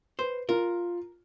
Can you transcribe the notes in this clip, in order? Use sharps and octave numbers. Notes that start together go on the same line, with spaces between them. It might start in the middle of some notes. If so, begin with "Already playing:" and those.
B4 C5
F4 A#4